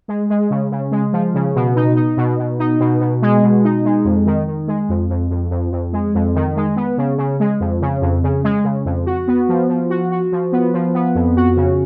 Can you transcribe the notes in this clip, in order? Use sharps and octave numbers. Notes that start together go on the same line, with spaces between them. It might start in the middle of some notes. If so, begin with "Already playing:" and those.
G#3
G#3
C#3
C#3
G#3
F3
C#3
B2
D#4
D#4
B2
B2
D#4
B2
B2
G#3
B2
D#4
G#3
F2
D#3
D#3
G#3
F2
F2
F2
F2
F2
G#3
F2
D#3
G#3
B3
C#3
C#3
G#3
F2
C#3
F2
C#3
G#3
C#3
F2
F#4
B3
F3
F3
F#4
F#4
F3
B3
F3
B3
F2
F#4
C#3